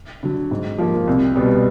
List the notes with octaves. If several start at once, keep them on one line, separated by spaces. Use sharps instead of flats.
D3 F#3
G#2
F3 A#3
C2
B2 G3 B3